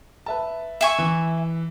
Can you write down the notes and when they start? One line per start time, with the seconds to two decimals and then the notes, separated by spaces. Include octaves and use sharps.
0.26 B4 E5 A5
0.81 E5 G#5 C#6
0.98 E3